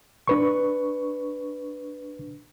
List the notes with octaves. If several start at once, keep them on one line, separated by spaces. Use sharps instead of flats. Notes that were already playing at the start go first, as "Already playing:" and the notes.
D4 B4 C#6